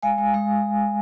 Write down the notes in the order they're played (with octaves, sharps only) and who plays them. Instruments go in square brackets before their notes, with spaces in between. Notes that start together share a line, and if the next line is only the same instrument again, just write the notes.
[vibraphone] G#3 F5 G#5
G#3
G#3